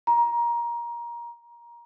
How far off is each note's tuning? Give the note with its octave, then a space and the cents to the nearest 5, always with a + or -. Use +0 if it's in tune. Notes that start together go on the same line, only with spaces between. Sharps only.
A#5 +20